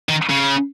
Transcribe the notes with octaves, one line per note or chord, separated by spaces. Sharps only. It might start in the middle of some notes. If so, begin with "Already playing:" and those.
D#3
C#3